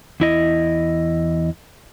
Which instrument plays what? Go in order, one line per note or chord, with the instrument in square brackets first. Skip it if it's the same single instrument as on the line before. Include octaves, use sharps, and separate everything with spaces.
[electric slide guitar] E2 E4 D#5